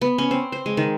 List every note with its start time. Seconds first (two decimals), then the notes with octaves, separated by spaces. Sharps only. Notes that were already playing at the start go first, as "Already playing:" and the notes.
0.01 B3
0.18 C#4
0.31 C4
0.52 C5
0.66 G#3
0.77 D#3